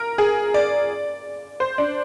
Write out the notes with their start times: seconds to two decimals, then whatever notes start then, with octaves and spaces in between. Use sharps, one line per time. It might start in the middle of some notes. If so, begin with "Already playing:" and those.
Already playing: A#4
0.18 G#4
0.54 D5
1.60 C5
1.78 D4